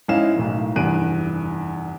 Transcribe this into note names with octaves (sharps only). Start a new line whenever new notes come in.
G#2 C#4 E4 D#5 F5 E7
B1 A2 D#3
F1 E2 G2 F#6 D7 D#7